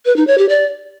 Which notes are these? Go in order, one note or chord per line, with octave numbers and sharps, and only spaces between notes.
B4
D#4
C#5
G4
D5